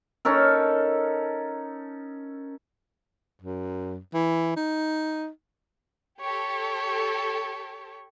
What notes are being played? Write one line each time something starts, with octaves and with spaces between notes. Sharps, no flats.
C#4 D#4 A4 A#4
F#2
E3
D#4
G4 A4 C#5